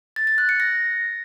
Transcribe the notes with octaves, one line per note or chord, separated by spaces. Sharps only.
A6
A6
F#6
C#7
A#6